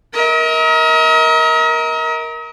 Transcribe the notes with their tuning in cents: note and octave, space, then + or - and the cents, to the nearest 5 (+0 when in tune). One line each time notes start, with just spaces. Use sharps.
A#4 +10 D#5 +45